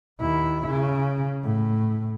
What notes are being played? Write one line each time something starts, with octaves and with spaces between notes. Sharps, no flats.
D#2 E4
C#3
A2